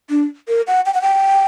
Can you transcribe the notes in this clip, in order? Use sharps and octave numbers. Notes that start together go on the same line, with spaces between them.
D4
A#4
F#5
G5
F#5
G5